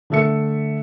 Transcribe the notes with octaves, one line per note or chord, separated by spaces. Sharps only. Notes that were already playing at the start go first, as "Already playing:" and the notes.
D3 A3 A4 E5 C#7